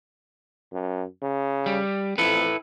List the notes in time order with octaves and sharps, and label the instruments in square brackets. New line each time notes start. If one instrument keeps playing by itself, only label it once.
[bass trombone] F#2
C#3
[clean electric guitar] G3
[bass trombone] F2 [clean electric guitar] E4 A4 B4